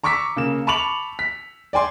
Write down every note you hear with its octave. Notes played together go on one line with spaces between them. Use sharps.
A#5 C#6 D6 E6 B6
C#3 A#3 E7
A5 B5 C#6 D6 F7 F#7
B6
D5 G5 G#5 C6 D6